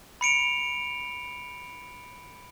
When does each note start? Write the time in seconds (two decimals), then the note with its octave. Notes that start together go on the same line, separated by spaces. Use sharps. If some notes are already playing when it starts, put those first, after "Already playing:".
0.21 B5 C#7 D7 F7